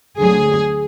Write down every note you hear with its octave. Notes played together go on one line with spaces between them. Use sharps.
D2 D3 F#3 G#4